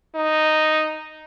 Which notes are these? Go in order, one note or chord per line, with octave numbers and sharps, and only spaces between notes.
D#4